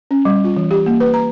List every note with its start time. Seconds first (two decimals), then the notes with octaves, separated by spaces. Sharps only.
0.11 C#4
0.25 G3
0.44 F4
0.57 E3
0.71 G4
0.86 A#3
1.00 B4
1.14 A#5